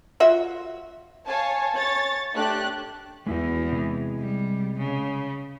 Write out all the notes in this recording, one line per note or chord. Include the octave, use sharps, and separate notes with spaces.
F4 F#4 E5
C#5 F5 G#5 A5
C#5 A6
A3 D4 G4 F#6
E2 G#3 E4 F#4
C3 G#3
G3
C#3